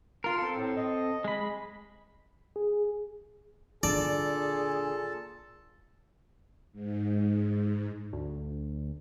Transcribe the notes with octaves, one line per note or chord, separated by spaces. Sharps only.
F4 A#4 C6
C4 A4
A2
D#5
G#3 B5
G#4
A#2 D3 G#4 A4 D5 A5
G#2
D2